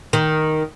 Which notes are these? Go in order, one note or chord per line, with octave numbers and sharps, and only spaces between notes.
D#3